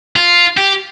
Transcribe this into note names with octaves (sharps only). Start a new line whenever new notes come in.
F4
G4